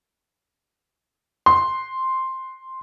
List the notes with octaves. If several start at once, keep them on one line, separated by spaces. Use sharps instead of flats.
C6